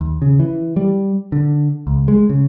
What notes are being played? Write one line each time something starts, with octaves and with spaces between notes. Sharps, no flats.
D#2
C#3
E3
G3
D3
C#2
G#3
C#3